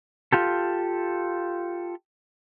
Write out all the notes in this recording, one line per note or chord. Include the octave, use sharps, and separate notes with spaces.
F4 G4 A4